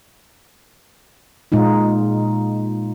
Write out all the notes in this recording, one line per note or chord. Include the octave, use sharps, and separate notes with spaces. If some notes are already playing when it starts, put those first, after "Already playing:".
A#2 G#3 D#4 F4